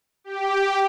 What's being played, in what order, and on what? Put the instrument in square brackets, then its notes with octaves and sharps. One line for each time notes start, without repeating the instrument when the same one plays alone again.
[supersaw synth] G4